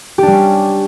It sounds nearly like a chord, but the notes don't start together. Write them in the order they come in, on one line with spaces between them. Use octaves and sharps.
G4 D4 G3 C#4